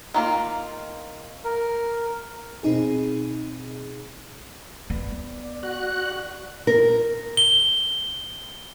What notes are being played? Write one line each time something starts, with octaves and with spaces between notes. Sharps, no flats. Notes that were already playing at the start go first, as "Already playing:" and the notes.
D#3 A#3 F4
A#4
B2 C4 D#4 G#4
B3 D5
F#4 F#6
A#4
G7